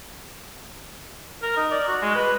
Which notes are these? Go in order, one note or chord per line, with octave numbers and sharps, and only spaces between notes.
A#4
D#4
D5
F#4
G#3
B4